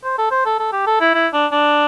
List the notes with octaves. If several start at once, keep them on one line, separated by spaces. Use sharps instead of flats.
C5
A4
C5
A4
A4
G4
A4
E4
E4
D4
D4